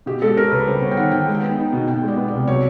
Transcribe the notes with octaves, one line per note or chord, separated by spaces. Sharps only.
B2 G4
G#3 A4
C#4 A#4
C#2 B4
G3 C5
B3 C#5
G5
D#3 F#5
D#3 G5
G#3
G5
B3
D#4
B2
B2 G5
G#3
D5
B3
C2 D5
F#3 C#5